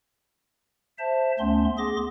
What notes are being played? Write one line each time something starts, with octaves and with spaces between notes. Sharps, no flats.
C5 E5 A5
D2 A3 B3 C#4 C6
B3 G#4 C6 D6 A#6